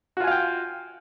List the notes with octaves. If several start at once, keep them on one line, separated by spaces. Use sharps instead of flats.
F4 F#4 F5 G5 G#5